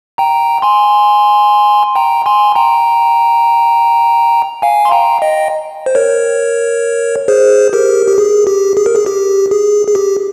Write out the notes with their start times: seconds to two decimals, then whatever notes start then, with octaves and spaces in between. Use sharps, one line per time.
0.18 G5 A#5
0.62 G#5 C6
1.96 G5 A#5
2.26 G#5 C6
2.55 G5 A#5
4.62 F5 G#5
4.85 C6
4.91 G5 A#5
5.22 D#5 G5
5.86 C5
5.95 A#4 C#5
7.28 G#4 C5
7.73 G4 A#4
8.07 G4
8.18 G#4
8.47 G4
8.77 G#4
8.86 A#4
8.95 G#4
9.06 G4
9.51 G#4
9.87 G#4
9.95 G4